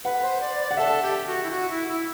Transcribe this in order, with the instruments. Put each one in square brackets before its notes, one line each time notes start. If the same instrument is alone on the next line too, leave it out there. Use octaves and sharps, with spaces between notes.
[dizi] B4 [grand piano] F#5
[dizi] C5
D5
D5
[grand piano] F#5
[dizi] A4 [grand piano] E5
[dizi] G4
F#4
E4
F#4
E4
E4